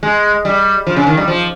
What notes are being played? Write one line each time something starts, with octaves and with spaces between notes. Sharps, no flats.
G#3
G3
F3
C#3
D#3
G3
F3